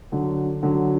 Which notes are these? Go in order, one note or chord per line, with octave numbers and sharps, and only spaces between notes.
D3 F#3
D3 F#3